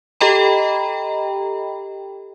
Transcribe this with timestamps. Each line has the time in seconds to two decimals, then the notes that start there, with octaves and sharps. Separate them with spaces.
0.21 G4 A4 D#5 G5 A#5 B5